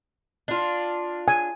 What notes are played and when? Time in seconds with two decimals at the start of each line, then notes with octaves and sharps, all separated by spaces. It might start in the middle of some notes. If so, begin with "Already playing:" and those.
0.48 D4 F4
1.28 G#5